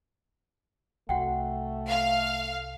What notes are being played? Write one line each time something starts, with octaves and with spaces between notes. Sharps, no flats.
C2 A3 F#4 F#5 G5
F5